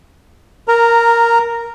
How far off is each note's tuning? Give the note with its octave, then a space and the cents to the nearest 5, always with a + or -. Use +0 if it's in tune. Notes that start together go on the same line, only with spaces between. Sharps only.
A#4 +0 A#5 -15